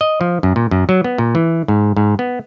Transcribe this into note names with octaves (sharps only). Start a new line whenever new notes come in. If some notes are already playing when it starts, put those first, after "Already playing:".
D#5
F3
F#2
A#2
F#2
F#3
B3
A#2
E3
G#2
G#2
B3